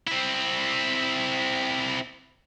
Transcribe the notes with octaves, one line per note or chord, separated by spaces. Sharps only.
C4 E4